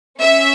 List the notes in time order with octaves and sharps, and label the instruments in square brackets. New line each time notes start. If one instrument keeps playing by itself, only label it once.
[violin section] C#4 E5